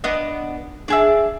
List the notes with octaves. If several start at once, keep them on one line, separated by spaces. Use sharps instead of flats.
B3 D4 D#5
D4 G#4 E5